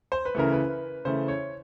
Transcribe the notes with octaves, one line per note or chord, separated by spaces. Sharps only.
C5
B4
C#3 E3 A3 A#4
B4
C#3 E3 A3 C5
C#5